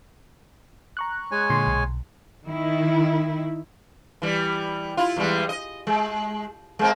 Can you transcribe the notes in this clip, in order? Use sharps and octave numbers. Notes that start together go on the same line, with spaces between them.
A#5 C#6 F#6
G#3 C#5 G#5
A#2 D3 C6
B1
D#3 E4
E3 G3
E4 F4
E2 G3 G#3
D#5
G#3
G#3 A#3 C4